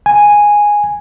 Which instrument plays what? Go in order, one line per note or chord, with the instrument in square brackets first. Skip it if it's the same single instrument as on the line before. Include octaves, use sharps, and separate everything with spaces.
[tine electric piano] G#5